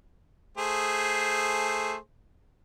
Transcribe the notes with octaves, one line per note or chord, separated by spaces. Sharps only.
A3 G#4 C5